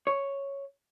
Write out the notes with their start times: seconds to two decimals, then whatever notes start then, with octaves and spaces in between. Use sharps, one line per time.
0.07 C#5